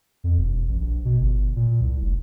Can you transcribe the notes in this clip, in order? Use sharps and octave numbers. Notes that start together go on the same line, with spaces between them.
F2
E1
A1
A#1
B2
G1
A#2
C2
F1